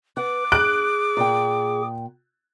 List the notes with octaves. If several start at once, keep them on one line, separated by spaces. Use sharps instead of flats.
B4 F#5 D6
G#4 F#6 D7
A#2 G5